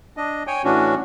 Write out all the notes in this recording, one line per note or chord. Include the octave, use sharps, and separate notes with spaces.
D4 D#5
C#5 G5 G#5
A2 E3 C#4 D4 F#4